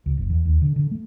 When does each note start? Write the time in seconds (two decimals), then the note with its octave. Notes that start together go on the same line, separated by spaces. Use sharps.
0.06 C#2
0.17 F#1
0.30 E2
0.45 D#2
0.62 D3
0.76 D3
0.91 A3